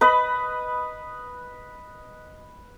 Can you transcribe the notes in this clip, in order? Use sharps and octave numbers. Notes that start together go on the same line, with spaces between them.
B4 D#5 B5